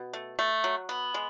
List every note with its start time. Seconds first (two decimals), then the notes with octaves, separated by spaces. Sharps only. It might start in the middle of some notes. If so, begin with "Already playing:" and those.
Already playing: B2
0.13 A3
0.39 A3
0.64 F#3
0.89 B3
1.14 G#3